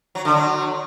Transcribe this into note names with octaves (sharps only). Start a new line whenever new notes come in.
F#3
D3
F#3